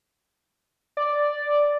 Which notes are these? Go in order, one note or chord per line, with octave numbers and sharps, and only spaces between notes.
D5